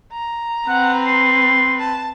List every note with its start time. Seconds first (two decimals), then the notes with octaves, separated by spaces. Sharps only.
0.12 A#5
0.68 C4 B4 F#5
1.06 C6
1.80 A5